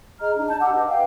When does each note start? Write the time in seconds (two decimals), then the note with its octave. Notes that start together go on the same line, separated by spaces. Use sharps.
0.20 G#4 D#5 A#5 F6
0.36 D4 D#4
0.49 A5 G6
0.60 G4 F#5 D6 E6
0.74 B4 D#5
0.87 B4 F5 G5